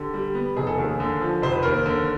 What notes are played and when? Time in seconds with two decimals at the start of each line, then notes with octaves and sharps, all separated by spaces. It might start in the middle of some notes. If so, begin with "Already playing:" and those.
Already playing: D3 G4
0.14 G3
0.35 B3
0.56 F1 G#4
0.67 A4
0.78 D#2 G#4
1.00 D3
1.21 F3
1.42 F1 C5
1.52 B4
1.62 D#2 A#4 C5
1.86 D3